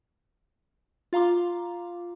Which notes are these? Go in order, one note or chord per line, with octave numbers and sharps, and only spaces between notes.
F4 F5 A#5 C6 D6